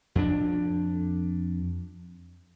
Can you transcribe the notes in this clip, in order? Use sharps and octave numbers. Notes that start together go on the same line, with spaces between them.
F2 D4